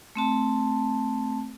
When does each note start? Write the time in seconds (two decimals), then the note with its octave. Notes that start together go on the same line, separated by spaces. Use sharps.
0.15 A3 C4 A5